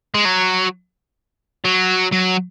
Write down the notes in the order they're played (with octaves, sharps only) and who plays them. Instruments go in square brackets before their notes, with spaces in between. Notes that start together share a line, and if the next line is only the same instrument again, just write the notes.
[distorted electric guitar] G#3
F#3
F#3
F#3